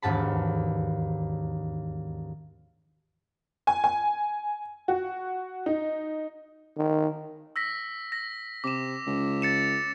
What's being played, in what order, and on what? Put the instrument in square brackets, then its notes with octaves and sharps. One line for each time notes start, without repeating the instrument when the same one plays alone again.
[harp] E1 D#2 G#2 A5 B5
[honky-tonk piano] G#5
G#5
F#4
D#4
[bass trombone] D#3
[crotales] E6 A#6 B6
A#6
[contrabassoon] C3 [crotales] D6 E7
[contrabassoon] C#2
[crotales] A6 C#7 E7